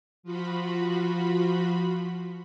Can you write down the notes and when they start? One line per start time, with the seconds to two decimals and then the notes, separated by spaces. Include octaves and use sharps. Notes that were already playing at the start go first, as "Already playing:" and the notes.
0.23 F3 F4 F#4 B5